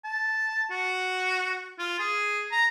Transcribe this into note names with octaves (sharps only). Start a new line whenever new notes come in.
A5
F#4
F4
G#4
A#5